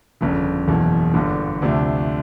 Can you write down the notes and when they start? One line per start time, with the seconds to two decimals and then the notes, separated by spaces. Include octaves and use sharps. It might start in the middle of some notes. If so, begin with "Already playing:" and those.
0.21 G1 F2 C#3
0.68 F#1 E2 B2
1.14 G1 G2 D3
1.62 D2 C3 F3 A3 D4